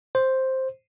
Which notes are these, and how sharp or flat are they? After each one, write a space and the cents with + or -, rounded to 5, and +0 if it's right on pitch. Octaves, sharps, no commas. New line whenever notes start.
C5 +5